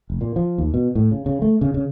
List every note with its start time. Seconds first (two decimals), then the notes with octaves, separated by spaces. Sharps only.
0.10 F1
0.21 A#2
0.36 F3
0.58 D#2
0.74 B2
0.95 A2
1.11 C#3
1.26 C#3
1.42 A3
1.61 C#3
1.74 C#3